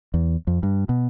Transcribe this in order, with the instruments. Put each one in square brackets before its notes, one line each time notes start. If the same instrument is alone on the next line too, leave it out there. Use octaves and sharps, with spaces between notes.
[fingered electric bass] E2
F2
G2
B2